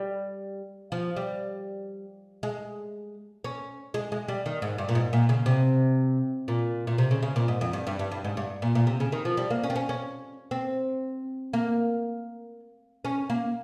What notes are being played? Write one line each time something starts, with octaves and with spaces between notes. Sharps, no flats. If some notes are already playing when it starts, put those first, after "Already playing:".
Already playing: G3
F3
G3
G#3
C#4
G#3
G#3
G3
D#3
G#2
G2
A#2
G#2
A#2
C#3
C3
A#2
A#2
C3
C#3
C#3
A#2
G#2
F2
G2
G2
G2
G2
G#2
G2
A#2
A#2
C3
C#3
D#3
F3
G3
A#3
C#4
C4
C#4
C#4
C4
A#3
C#4
A#3